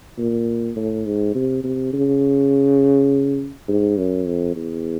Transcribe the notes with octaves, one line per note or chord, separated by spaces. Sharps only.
A#2
A2
G#2
C3
C3
C#3
G#2
F#2
F2
E2